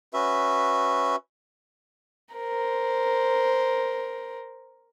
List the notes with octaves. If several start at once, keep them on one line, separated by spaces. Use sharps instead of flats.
C#4 F#4 B4 E5
A#4 C5